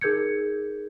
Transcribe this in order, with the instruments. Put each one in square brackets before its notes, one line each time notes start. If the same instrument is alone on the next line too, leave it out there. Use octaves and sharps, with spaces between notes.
[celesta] D#4 G#4 A#4 G6 G#6 C#7